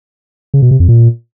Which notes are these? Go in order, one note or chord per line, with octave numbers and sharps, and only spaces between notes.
C#3
B2
C3
F2
A#2